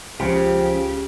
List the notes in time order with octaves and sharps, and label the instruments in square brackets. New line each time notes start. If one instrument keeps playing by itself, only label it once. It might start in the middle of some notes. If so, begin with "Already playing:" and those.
[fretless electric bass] C#2 [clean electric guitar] C#3 [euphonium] F3 [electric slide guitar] G4